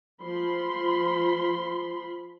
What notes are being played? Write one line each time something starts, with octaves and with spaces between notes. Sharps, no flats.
F3 B5 C6